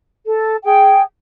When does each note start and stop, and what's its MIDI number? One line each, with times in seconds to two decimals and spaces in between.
0.25 0.55 69
0.64 1.02 68
0.64 1.02 79